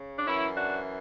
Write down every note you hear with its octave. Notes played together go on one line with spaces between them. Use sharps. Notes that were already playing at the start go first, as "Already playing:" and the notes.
Already playing: C#3
D4
F#2 E3 C#4 E4
D4 F#4